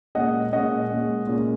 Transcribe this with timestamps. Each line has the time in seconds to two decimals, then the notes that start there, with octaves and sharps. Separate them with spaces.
0.15 A#2 G#3 C#4 D#5 F#5
0.52 A#2 G#3 C#4 D#5 F#5
0.90 A#2 G#3 C#4
1.27 A#2 G#3 C#4